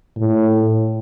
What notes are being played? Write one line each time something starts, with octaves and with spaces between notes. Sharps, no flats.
A2